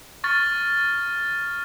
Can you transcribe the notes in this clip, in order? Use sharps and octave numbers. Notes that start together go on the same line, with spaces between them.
C#6 F6 A6